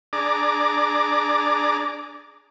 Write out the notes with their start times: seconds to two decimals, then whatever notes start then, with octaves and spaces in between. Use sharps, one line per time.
0.13 D4 G#4 D5 A#5 D6